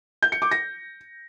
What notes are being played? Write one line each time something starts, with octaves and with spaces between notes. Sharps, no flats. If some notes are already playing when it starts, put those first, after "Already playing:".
G6
C#7
D6
A#6